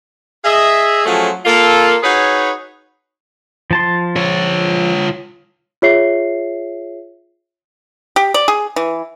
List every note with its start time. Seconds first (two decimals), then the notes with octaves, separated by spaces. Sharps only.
0.45 G#4 D#5 E5
1.05 F3 F#3 A3 C#4 F4 G#4
1.45 A#3 F4 A4
2.03 D#4 F#4 G#4 B4 C#5
3.71 F3 A5 C6
4.16 F4 C#5
5.82 F4 G#4 C#5 E5 C7
8.16 G4
8.34 D5
8.48 G#4
8.76 E3